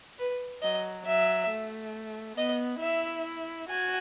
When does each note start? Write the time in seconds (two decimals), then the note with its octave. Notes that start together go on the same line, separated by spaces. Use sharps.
0.19 B4
0.62 F#3 D#5
1.06 F#3 E5
1.50 A3
2.37 B3 D#5
2.82 E4 E5
3.69 F#4 G#5